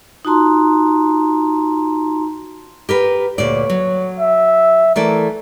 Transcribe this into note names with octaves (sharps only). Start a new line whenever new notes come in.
D#4 F4 F#4 A5 A#5 C6
G4 A#4 B4
D2 A#2 C#5 D5
F#3
E5
E3 A3 A#4 D5